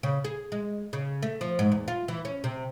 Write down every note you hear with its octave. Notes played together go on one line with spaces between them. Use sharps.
C#3
G#4
G#3
C#3
A3
F3
G#2
E2
F4
E3
C#4
C3